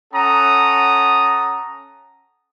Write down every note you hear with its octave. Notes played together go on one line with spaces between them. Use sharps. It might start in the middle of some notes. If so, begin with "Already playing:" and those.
C#4 A4 F#5 A#5 D#6